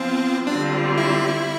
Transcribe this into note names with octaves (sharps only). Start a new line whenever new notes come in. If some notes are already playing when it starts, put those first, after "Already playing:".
Already playing: F3 B3 C4 F4
D3 G3 C4 D4 F4
E4